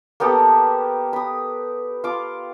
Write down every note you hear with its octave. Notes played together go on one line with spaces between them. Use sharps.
A#3 B3 G4 A4
B5 D#6
F4 D6